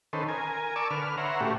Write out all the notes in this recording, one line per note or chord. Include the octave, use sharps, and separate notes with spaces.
D#3 C#4 A4 B4 C5
A#4 G#5
D5 A5 C#6 D6 E6
D3 B4 F6
B4 C#5 E5 F#5 A#5 C6
A2 A3 C#4 F#4 G4